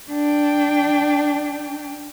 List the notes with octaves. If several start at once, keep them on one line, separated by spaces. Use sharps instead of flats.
D4 G5